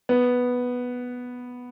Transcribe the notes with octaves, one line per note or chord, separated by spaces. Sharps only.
B3